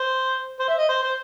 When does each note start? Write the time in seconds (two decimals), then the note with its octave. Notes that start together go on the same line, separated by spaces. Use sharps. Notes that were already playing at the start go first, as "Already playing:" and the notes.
Already playing: C5
0.59 C5
0.68 E5
0.78 D#5
0.89 C5
1.03 C5